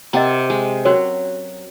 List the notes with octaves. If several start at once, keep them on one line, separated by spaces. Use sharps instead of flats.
C3 C4 A#4 D#5 F#5 A#5
G#3
F#3 C#4 F#4 A#4 C#5